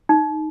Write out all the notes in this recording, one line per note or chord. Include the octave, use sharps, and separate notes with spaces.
D#4